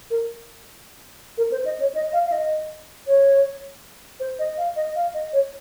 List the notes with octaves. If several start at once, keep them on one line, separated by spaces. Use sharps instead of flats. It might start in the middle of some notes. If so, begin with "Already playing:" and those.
A#4
A#4
C5
D#5
C#5
D#5
F5
F5
D#5
C#5
C5
D#5
F5
D#5
F5
D#5
C#5